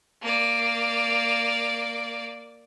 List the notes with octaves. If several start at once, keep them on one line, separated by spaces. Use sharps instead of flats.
A#3 D5